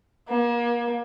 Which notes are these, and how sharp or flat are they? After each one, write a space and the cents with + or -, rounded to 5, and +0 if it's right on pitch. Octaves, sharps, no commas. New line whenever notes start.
A#3 +35